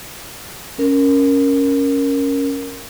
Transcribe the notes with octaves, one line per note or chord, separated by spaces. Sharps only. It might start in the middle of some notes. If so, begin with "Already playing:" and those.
C#4 A#4